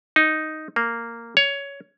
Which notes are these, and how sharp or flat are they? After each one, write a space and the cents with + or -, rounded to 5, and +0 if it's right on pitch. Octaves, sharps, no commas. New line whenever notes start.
D#4 +0
A#3 -10
C#5 +15